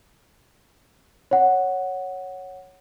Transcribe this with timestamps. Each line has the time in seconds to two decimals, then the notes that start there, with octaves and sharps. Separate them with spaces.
1.31 C#5 F#5